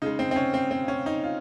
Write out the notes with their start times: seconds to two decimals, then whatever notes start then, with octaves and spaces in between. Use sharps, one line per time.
0.02 C#3 G#3 D#4
0.19 C4
0.31 C4
0.36 C#4
0.54 C4
0.71 C4
0.88 C#4
1.06 D#4
1.24 F4